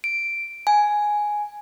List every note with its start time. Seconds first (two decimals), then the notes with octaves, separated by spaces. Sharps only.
0.04 D7
0.67 G#5